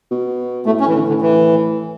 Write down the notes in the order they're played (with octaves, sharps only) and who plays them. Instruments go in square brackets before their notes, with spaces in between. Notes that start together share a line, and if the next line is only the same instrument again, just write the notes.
[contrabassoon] B2
[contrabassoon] A2 [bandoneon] A3
[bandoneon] C#4
E3
D3
D3
E3